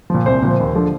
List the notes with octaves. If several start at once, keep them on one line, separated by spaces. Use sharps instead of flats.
A#2 F3
C2 C5
A#2 F3
D#2
D3 F3